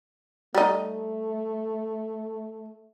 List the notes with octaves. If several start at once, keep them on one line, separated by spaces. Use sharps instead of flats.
G3 A3 D#4